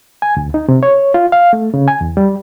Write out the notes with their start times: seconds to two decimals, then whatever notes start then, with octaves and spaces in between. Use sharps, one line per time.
0.22 G#5
0.37 D2
0.54 D#4
0.68 C3
0.83 C#5
1.14 F4
1.32 F5
1.53 A3
1.74 C#3
1.88 G#5
2.01 E2
2.17 G3